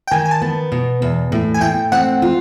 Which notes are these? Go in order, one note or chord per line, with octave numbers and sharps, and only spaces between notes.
G5
D#3 G#5
G#5
A5
B3
B2
E2
A2
G#5
A2 G5
C4 F#5
F4